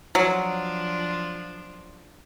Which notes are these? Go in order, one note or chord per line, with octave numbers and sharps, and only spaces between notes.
F3 F#3 D4